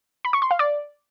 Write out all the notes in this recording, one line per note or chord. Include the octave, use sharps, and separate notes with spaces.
B5
C#6
C6
F5
D5